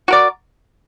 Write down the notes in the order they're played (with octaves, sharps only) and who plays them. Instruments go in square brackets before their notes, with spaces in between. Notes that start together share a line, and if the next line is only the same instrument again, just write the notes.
[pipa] F#4 A#4 D5